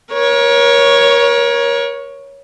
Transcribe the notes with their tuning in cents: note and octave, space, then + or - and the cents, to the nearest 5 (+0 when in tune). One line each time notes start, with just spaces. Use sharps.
A#4 +35 C#5 +0